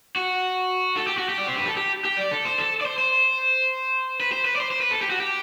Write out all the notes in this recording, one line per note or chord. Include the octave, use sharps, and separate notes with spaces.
F#4
A4
G4
F#4
G4
D5
C5
B4
A4
G4
G4
D5
A4
C5
A4
D5
C5
C5
B4
C5
B4
D5
C5
C5
B4
A4
G4
F#4
G4